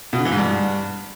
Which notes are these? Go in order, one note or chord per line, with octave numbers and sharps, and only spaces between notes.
B2
D3
E3
G#2
G2